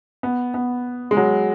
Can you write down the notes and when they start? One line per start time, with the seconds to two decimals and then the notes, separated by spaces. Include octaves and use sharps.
0.23 B3
0.54 B3
1.11 G#3
1.17 F#3